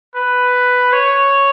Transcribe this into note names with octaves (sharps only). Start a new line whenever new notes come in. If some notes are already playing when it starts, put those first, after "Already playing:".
B4
C#5